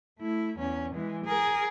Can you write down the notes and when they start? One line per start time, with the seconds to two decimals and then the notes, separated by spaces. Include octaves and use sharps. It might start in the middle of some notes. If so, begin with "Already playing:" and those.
0.19 A3 E4
0.58 E2 C#4
0.95 E3 G#3
1.25 G#4 A#4